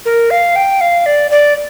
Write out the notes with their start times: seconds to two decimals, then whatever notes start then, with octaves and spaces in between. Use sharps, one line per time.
0.05 A#4
0.31 F5
0.56 G5
0.81 F5
1.06 D5
1.31 D5